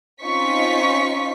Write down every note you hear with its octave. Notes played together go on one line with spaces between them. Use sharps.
C4 C#4 D#4 F4 C#6 B6